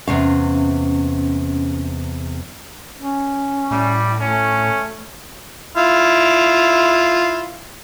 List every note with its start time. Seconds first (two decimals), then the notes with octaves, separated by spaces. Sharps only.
0.08 E2 C3 C#4 F5
2.99 C#4
3.71 A2 G3
4.20 A3 C#4
5.77 E4 F4